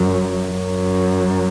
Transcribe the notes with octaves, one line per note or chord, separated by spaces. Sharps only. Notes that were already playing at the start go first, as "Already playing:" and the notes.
Already playing: F#2
F#2